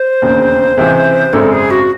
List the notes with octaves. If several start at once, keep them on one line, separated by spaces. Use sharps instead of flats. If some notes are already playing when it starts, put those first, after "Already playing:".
Already playing: C5
E1 D#2 C#3
C#2 C3 E3
G#1 F#2 C#3 G#3 C4 A4
G#4
F#4